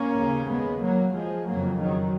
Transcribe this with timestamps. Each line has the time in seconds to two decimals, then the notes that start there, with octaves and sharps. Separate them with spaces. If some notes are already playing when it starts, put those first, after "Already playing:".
Already playing: A#3 C#4
0.16 D#2 C#3
0.49 G#3 B3
0.82 F#3 A#3
1.14 F3 G#3
1.47 F2 C#3 F#3 A#3
1.80 D#3 F#3